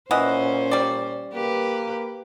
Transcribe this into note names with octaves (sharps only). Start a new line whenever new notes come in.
A#2 E3 C#4 C5 D#5 F#5
G3 D5
A#3 G4 B4